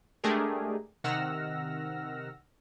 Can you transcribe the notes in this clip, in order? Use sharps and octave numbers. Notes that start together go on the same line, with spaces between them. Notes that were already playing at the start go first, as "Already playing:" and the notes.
G#3 A3 D4 G4 G#4 A#4
C3 D#3 F#5 E6 F6 A#6